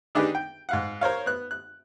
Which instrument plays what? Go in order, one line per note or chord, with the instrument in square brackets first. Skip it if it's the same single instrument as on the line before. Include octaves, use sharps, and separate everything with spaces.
[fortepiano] D#3 D4 D#4 G4 G#4 B4
G5
G#2 F5 F#5
A#4 C5 C#5 F5
B3 F#6
F#6